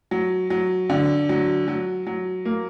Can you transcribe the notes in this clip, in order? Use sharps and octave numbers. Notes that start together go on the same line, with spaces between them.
F#3
F#3
D3
F#3
F#3
F#3
A#3